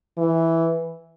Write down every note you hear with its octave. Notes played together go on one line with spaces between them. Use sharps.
E3